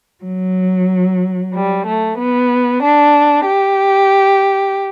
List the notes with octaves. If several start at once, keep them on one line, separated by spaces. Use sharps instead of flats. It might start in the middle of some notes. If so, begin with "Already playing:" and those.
F#3
G3
A3
B3
D4
G4